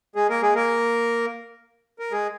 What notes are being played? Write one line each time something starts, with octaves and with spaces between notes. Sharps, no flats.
G#3 G#4
A#3 A#4
G#3 G#4
A#3 A#4
A#4
G#3 G#4